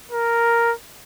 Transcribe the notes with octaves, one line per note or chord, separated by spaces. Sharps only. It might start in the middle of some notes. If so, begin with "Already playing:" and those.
A#4